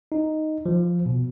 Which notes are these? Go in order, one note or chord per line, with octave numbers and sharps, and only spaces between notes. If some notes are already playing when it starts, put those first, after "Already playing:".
D#4
F3
B2